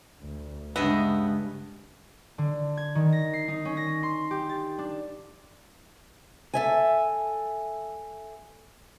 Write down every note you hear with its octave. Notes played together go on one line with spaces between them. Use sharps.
D2
G2 C#3 G#3 B3 D#5 E5
D3
G#6
D#3
A#6
C7
D#4
C#4
A#6
C6
G4
A6
D4
A4 E5 G#5